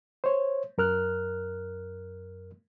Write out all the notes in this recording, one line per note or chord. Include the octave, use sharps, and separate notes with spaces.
C5 C#5
F#2 A#4 F6 F#6